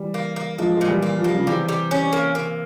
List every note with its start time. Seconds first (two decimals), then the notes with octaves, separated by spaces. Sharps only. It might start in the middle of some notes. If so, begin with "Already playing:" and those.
Already playing: E3 G3
0.14 A#3
0.36 A#3
0.58 F3 G#3 A#3
0.77 A#2 G#3
0.88 E3 G3
1.02 A#3
1.17 F3
1.24 G3 A#3
1.34 C#3 F3
1.47 C3 E3 G3
1.69 G3
1.91 C#4
2.13 A#3
2.35 A#3